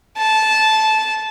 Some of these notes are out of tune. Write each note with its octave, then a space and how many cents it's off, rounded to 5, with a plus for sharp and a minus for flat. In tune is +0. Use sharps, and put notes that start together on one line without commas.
A5 -15